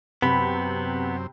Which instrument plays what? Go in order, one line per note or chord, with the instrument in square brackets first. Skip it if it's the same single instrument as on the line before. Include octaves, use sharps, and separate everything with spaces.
[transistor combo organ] F#2 C4 [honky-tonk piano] C3 [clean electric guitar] B3 [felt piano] B5